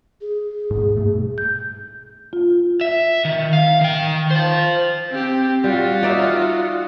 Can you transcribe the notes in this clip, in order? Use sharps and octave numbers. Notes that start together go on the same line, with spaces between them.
G#4
G#2
G2 B2 A3
G6
F4
E5
D#3
F5
D#3 G5
C5 F5
C4 G4
G3 F4 F#4
D#4 D5 E5